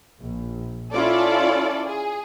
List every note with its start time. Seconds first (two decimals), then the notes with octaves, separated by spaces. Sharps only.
0.20 A#1
0.92 C#4 E4 F4 A4 D5
1.86 G#4